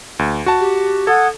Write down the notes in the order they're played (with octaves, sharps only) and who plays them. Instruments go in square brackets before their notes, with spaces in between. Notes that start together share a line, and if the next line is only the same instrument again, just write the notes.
[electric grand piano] D2
F#4 A5
[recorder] G4
[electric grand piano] A4 [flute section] F#5 D#6 G#6